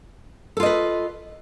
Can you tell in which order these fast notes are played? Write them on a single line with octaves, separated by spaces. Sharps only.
A4 F4 D#5 B4